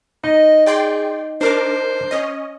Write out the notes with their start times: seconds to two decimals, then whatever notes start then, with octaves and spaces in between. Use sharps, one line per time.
0.24 D#4 D#5
0.66 G#4 D5 G5 C6
1.41 D4 A#4 C5 D6
2.11 C#4 D#5